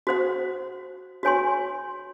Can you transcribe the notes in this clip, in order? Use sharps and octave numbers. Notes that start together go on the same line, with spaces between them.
F#4 C5 F#5
F#4 C#5 G#5 C6